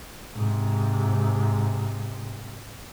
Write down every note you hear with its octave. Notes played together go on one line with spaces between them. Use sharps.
G#2 C3